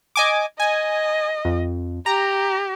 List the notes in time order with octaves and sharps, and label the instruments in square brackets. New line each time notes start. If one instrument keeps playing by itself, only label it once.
[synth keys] D#5 G#5 D6
[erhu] D#5 [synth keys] G#5
[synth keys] F2
[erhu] G4 [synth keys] A#5